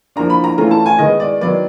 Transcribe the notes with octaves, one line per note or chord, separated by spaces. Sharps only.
F3 A#3 D4 A#5
B5
A#5
E3 A3 C#4 F4 A#5
A5
G#5
D#3 G#3 B3 D#4 D#5
D5
D#3 F#3 B3 D5